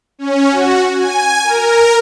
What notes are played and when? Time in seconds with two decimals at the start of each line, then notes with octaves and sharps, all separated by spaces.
0.19 C#4
0.50 F#4
0.95 G#5
1.44 A#4